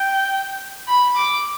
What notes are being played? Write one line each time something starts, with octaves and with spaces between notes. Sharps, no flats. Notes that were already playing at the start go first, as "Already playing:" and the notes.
Already playing: G5
B5
D6